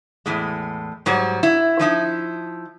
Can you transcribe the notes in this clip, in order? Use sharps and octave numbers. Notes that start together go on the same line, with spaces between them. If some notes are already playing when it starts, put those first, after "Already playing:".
E2 A2 G#3
G#2 F#3 G3 F#4
E4
F3 D#4 E4